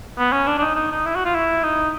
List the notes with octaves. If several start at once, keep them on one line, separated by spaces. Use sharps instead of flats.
B3
C#4
D4
D4
D#4
D#4
D#4
E4
F#4
F4
E4
D#4